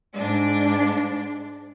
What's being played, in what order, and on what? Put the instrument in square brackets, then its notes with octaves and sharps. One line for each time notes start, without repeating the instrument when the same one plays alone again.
[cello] G#2 D4